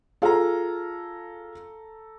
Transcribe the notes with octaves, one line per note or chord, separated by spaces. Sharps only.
F4 G#4 A4 F5 A#5